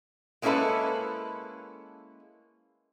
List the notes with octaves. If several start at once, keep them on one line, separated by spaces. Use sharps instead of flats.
G#3 A#3 C#4 E4 A4 B4